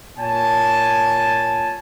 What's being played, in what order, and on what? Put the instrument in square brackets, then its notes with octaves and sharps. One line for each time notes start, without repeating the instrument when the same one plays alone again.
[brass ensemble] A#2 C#5 G#5 A5